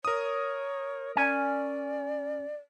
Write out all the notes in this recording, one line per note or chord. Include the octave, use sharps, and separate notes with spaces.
A#4 C#5 D#6
C#4 D5 G#5